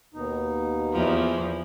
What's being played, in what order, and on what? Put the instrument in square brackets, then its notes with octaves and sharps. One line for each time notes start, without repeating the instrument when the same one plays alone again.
[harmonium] D#2 B2 D#4
[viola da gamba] E2 F3